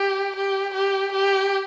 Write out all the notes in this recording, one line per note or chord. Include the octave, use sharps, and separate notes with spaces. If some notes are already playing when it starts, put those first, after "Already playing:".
Already playing: G4
G4
G4
G4